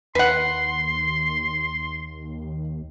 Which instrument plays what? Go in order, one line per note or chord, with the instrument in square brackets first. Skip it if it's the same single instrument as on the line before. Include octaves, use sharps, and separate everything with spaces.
[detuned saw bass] D#2 [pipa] B4 F#5 [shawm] C6